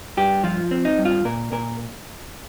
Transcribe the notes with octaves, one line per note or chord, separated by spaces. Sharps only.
G2 G4
F3 F4
C4
D#4
G2
F4
A#2 A#4
A#2 A#4